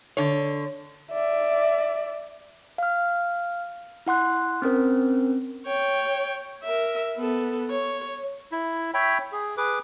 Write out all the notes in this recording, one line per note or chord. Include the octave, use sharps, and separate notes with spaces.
D3 C#5
D5 E5
F5 F6
E4 F#5 C6 F#6
C4 C#4 A#4 C5
C#5 G5
A#4 E5
B3 A4
C#5
E4
C#5 E5 G5 B5
G#4
G#4 B4 D6